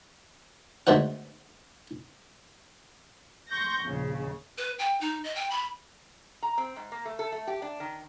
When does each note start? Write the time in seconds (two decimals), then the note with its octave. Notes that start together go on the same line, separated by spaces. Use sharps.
0.87 D2 G#3 A3 B3 C5 F#5
3.49 C6 C#6 G6 A#6
3.84 A#1 D#2 C#3
4.58 B4
4.79 G5
5.01 D#4
5.24 D#5
5.36 G5
5.51 B5
6.43 A#5
6.58 C4
6.76 G#2
6.92 A#3
7.06 A3
7.19 A4
7.32 A3
7.47 G4
7.62 D4
7.80 D#3